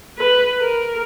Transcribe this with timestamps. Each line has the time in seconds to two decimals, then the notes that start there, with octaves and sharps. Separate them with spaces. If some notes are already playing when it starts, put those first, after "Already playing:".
0.18 B4
0.60 A#4